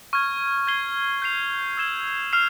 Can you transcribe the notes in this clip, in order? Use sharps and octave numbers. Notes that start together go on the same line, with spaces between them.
C#6 F6 G#6
G#6 C7 G7
G6 C7 F7
E6 G#6 E7 G7
F6 C7 F7